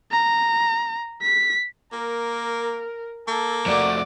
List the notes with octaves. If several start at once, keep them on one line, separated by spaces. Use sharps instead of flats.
A#5
B6
A#3 A#4
A#3 A4
F2 A3 F#4 D5